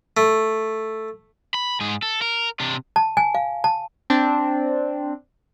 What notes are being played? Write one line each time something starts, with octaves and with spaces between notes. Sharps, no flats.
A3
B5
G#2 G#4
A4
A#4
C3 D4
A5
G#5
F5
A5
C4 D4